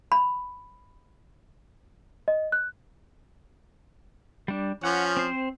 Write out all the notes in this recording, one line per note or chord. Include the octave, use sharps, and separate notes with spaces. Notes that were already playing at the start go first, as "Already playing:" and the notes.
B5
D#5
F#6
G3 D4
F3 C#4 F#5
C4 C5